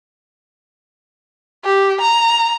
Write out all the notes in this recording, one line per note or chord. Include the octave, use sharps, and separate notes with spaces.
G4
A#5